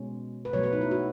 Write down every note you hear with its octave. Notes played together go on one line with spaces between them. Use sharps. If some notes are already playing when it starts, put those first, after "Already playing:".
Already playing: B2 G#3 C#4
B4
B2 F#3 A3 C#5
B4
D#4
E4
F#4